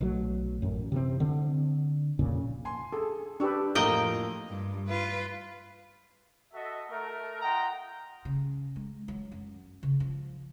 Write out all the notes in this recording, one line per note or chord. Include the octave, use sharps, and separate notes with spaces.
B1 F#3 A3
A1 F#2
C3 E3 C4
D3 C4
F2 A#2 C#3
G#5 C6
G#4 A4
D4 G4 B4 C#6 E6
F2 A2 F3 A#3 D#5 G5
G2
F4 B4
F#4 A4 D#5 E5
A3 A#4
F4 D#5 F#5 G5 A#5
C#3
G#3
F#3
F#2
C#3
F3